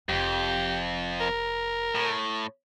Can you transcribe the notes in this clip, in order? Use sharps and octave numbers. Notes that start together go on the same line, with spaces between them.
F1 F2 G4
A#4
A2